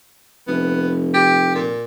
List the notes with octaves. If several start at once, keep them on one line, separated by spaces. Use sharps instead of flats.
F1 B3
G4
A#2